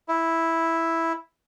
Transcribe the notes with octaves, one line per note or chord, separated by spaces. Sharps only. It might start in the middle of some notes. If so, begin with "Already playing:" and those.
E4